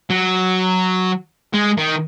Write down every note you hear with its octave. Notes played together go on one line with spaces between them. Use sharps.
F#3
G#3
D#3